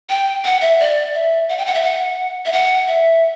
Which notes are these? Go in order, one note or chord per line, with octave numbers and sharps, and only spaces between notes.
G5
F#5
E5
D5
E5
F#5
G5
F#5
E5
F#5
E5
F#5
E5